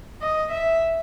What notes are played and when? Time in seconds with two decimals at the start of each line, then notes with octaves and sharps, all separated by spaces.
0.21 D#5
0.51 E5